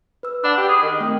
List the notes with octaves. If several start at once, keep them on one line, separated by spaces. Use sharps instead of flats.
B4 E6
D4 F#5 B5
G4
G#4
D#3
A3 C4 G5